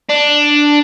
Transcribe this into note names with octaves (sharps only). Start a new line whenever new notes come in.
D4